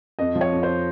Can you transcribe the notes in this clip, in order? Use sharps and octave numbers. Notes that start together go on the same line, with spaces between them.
F2 D#5
F3
C#5
F2
C5